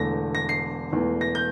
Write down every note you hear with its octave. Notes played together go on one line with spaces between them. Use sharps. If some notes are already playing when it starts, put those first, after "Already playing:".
Already playing: E1 E2 D3 A3 A#6
A#6
C7
E1 E2 E3 A3
A#6
G6